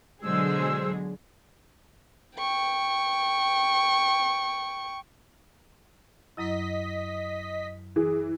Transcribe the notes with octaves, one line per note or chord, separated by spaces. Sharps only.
B2 D3 F#3 G#3 G#4 C5 E6
G5 C#6
F#2 F#3 E4 D#5 B6
E3 G#4